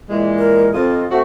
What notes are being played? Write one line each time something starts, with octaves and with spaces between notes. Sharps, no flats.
A#2 E3 G#3
A#4
F2 C4 F4 D#5
A3 C4 F#4